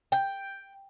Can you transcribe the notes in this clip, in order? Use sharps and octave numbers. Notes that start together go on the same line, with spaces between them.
G5